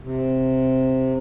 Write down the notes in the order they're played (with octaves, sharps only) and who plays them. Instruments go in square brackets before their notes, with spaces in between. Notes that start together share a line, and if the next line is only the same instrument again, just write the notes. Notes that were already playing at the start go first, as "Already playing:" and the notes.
[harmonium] C3